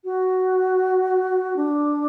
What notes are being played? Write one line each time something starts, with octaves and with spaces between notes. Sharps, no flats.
F#4
D4